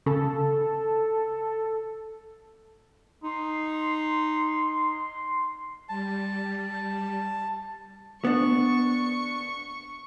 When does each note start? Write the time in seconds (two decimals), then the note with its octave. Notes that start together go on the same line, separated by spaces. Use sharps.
0.06 C#3 A4
3.23 D#4 C6
5.89 G3 A5
8.25 B3 D4 C#6